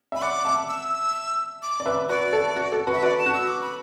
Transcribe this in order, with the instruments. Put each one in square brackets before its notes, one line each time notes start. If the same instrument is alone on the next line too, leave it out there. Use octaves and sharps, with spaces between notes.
[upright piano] E5 [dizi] B5
[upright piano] D5 F#5 [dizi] D6
[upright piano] E5 A5
[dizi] E6
D6
[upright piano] D5
B4 E5
[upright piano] F#4 B4 [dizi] D5
[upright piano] A4
F#4
A4
F#4 B4
[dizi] E5
[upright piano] F#4 B4 [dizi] D5
[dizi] A5
[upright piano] F#4
[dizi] E6
D6
B5